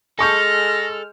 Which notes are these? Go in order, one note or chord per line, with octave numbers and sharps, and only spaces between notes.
G#3 A4 G#5 C#6 F6 G6 A#6